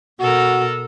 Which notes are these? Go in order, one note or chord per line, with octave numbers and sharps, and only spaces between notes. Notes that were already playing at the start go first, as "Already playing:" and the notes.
B2 F#4 A4 A#4